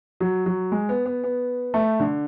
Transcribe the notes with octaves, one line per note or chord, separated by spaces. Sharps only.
F#3
F#3
G#3
B3
B3
B3
A3
D3